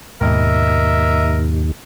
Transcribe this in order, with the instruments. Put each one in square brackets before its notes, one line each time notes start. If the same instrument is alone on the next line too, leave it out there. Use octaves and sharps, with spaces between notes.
[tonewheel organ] D#2 [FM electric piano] G#2 B2 [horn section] A#4 D#5 E5